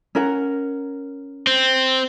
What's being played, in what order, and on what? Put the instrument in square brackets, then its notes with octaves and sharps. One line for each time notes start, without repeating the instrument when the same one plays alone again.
[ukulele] C#4 A#4 F#5
[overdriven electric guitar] C4